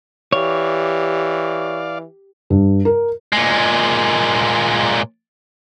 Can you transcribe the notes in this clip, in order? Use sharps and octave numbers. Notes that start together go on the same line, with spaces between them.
E3 G4 C#5 D5 F5
G2
A#4
A#2 G#3